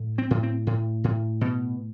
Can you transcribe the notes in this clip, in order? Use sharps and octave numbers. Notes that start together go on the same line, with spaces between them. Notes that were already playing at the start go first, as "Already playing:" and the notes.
Already playing: A2
C4
A2
C4
A2
A2
B2